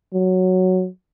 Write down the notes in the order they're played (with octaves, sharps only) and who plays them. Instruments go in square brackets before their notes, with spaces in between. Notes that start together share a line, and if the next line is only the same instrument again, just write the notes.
[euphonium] F#3